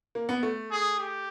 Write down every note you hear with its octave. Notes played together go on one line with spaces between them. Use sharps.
A#3
B3
A3
G#4
G4